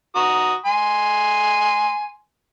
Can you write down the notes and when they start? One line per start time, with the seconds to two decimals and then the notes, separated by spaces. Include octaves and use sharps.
0.16 F#4 A#5 D#6
0.66 G#5 C6